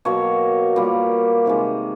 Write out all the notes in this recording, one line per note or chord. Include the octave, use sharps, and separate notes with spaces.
B2 F#3 A#3 C#5
A#2 G3 A#3
C3 D#3 G#3